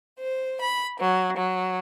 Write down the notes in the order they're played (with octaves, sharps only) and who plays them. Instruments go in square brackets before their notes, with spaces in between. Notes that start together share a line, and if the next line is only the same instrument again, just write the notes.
[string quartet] C5
B5
F#3
F#3